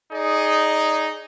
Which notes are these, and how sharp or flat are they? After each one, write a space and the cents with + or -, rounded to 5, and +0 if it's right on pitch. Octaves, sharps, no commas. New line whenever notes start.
D#4 +0 G#4 +0 D5 -20